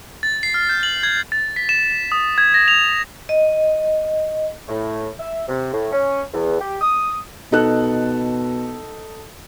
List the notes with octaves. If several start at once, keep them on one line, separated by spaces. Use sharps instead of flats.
A6
C7
F6
G6
F#7
G#6
A6
B6
E7
D#6
G#6
A#6
F7
D#5
A2
E5
C3
A2
C#4
E2
G4
D#6
B2 D#4 A4 F#6